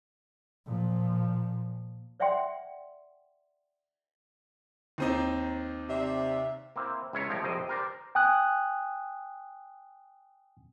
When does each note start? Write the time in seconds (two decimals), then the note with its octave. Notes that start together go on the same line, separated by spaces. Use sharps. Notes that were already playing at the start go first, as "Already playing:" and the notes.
0.66 A#2 F3
2.20 C#5 D5 E5 F#5 G5 C6
4.98 D#2 C4 D#4
5.89 C3 D5 E5
6.76 A#3 C4 E4 C5
7.13 C#2 E4 F4 C#5 E5 A#5
7.29 C2 F3 C#5 G5 A#5
7.43 A#1 F2 C3 C5 D#5 G5
7.68 G4 A#4 C5 D5
8.15 G5 G#5 D#6 F#6